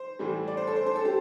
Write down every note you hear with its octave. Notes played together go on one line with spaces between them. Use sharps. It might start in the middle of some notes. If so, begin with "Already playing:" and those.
Already playing: C5
A2 E3 G3
D5
C5
A4
C5
C5
A4
G4